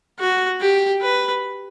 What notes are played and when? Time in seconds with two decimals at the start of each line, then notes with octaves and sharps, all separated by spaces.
0.20 F#4
0.61 G4
1.02 B4